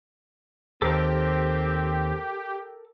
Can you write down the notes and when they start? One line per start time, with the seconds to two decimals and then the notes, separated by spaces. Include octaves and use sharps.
0.82 D#2 C4 G4 A4 A#4